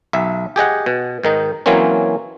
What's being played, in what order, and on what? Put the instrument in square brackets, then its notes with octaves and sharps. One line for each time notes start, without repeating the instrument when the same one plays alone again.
[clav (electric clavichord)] B1 E5
G4 G#4 D#5 F#5
B2
G#2 D#3 D#4
E3 F#3 A#3 C4 C#4